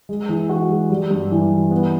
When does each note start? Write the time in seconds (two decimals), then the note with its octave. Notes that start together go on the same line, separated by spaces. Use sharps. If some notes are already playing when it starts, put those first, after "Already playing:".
0.09 G#3
0.29 E3
0.49 F#4
0.69 G#3
0.90 G3
1.10 G2
1.31 E3
1.51 G3
1.71 B3